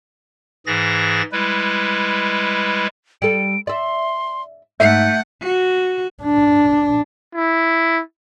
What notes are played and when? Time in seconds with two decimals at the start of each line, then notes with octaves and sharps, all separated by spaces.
0.66 G#2 E3 G#4 A6 A#6
1.32 G3 G#3 E4 B4
3.22 G3 A4 D7
3.67 D5 E5 C6
4.80 G#2 A3 E5 F#5 G6
5.42 F#4
6.23 D4
7.35 E4